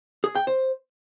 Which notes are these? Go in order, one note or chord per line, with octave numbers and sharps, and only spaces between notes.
G#4
G5
C5